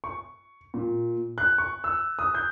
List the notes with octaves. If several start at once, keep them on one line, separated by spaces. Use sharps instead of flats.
C#6
A#2
F#6
C#6
E6
D#6
G6